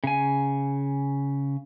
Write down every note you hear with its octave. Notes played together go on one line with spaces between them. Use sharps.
C#3 G#5